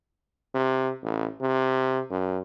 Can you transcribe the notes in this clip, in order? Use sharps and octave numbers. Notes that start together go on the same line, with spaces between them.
C3
A1
C3
F#2